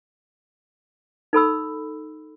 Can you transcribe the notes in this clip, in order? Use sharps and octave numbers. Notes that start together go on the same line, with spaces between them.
D#4 A4 B5 E6